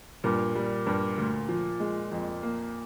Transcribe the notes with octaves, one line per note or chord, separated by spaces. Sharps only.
G2 A#2
G3
G2
D2
F3
G#3
F2
A#3